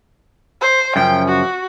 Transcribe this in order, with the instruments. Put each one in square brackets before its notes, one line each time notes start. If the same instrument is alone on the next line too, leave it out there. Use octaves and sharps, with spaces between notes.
[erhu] C5
[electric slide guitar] F#2 C#3 F3 [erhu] G5
[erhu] F#4